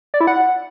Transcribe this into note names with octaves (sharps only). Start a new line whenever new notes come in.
D5
E4
F#5